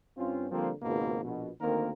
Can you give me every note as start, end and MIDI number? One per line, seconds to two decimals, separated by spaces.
0.17 0.47 43
0.17 0.47 60
0.17 0.47 61
0.17 0.47 65
0.51 0.72 50
0.51 0.72 53
0.51 0.72 55
0.51 0.72 58
0.51 0.72 60
0.82 1.22 32
0.82 1.22 37
0.82 1.22 44
0.82 1.22 47
0.82 1.22 58
1.23 1.49 34
1.23 1.49 47
1.60 1.91 38
1.60 1.91 51
1.60 1.91 58
1.60 1.91 60
1.60 1.91 70